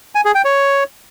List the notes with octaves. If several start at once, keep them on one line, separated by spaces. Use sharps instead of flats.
G#5
G#4
G5
C#5